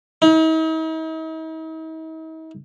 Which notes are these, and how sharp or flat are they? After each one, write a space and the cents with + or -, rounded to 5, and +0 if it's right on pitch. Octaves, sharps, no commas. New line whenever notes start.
D#4 +45